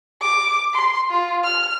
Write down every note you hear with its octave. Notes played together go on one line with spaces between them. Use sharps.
D6
C6
F4
F6